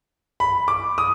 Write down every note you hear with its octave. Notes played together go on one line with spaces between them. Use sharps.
B5
D6
D#6